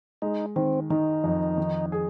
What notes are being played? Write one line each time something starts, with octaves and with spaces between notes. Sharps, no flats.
G#3 D#4
D#3 C4
D#3 D#4
F2
D#3
G#4